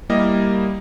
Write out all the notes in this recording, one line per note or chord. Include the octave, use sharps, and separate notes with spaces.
G3 A#3 E4 G4 A#4 D#5